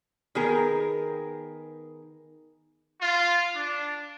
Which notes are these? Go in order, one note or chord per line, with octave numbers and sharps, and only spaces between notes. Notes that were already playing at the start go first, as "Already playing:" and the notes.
D#3 B3 G#4 A#4
F4
D4